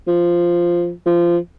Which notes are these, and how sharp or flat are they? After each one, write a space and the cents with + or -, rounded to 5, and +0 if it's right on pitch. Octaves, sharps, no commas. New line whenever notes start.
F3 -5
F3 -20